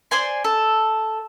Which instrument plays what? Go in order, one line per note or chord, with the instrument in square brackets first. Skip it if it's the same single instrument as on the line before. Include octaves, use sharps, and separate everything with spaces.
[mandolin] C5 D5 G#5 C6
A4